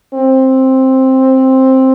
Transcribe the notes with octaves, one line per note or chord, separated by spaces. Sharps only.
C4